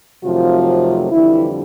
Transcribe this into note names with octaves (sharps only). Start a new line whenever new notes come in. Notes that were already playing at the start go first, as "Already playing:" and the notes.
F2 C3 D#3 F3 F#3 A3 F4
F2 D3 E3 G3 E4